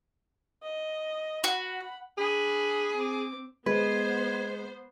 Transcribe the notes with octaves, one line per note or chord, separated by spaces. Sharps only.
D#5
F#4 F#5 B5
D4 G#4 B5
C4 D6
G#3 B3 B4 C5 G#6